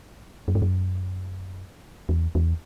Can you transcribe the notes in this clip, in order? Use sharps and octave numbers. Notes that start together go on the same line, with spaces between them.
F#2
G2
F#2
E2
E2